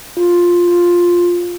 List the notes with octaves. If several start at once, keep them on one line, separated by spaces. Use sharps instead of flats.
F4
F4